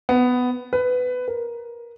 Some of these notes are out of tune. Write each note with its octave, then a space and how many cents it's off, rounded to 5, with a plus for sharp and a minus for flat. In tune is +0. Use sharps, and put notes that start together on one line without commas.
B3 +10
B4 +15
A#4 +15